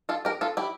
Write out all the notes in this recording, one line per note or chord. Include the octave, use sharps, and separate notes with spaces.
F4 A4
G4 A#4
F4 A4
E4 G4